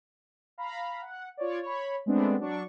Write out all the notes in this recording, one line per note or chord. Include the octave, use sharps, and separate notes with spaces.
F5 A#5 B5
F#5
F4 C#5 D5
C#5 B5
G#3 A3 B3 C4 D4
F#3 D4 C#6